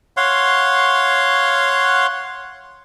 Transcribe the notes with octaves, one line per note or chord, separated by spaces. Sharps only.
C#5 F5 F#5 C6